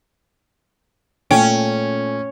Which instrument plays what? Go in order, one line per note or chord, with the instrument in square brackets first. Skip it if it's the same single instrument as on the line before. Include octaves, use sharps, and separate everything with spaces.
[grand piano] A#2 A3 [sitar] C#4 [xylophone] G5